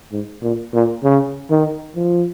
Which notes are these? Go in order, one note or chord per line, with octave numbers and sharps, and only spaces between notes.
G#2
A#2
A#2
C#3
D#3
F3